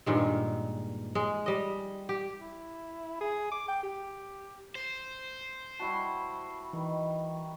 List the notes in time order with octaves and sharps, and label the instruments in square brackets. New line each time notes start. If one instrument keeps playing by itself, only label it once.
[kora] G2 A#2 D#3 G#3
G#3
G3 D#5
G4
[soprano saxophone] E4
G#4
D6
G5
G4
[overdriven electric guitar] C5
[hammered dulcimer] G3 E4 F#4 [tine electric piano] A5
[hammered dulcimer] D#3 [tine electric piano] E3